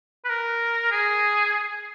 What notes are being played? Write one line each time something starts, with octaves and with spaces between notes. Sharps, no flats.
B4
A#4
G#4